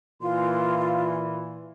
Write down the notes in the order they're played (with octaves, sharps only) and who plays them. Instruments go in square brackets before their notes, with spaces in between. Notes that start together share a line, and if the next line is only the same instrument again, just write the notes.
[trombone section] A#2 E3 [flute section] F4 C6